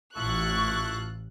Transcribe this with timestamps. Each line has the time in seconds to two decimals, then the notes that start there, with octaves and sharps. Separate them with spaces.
0.16 A1 E4 F4 A4 C#6 F#6